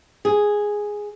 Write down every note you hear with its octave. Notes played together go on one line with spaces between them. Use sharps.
G#4